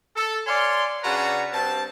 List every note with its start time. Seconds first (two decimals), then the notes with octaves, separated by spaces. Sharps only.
0.16 A4
0.47 C#5 D5 F5 G#5 C6
1.04 C#3 D4 F#4 B4 C#5 A#5
1.53 G2 C4 A5